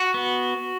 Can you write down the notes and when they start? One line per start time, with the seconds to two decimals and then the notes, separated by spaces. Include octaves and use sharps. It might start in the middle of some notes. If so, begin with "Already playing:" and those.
Already playing: F#4
0.14 B3